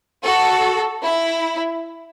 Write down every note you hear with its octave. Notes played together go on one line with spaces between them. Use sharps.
F#4 A4
E4